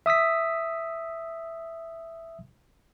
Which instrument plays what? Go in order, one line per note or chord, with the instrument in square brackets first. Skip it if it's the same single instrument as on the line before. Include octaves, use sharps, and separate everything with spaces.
[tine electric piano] E5 D#6 E6 B6